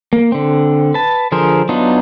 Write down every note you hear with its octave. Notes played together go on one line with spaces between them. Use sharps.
A#3
D3 C4
B4 A5
D3 F3 G#4 A#4 C5
F#3 B3 D4 D#4 F4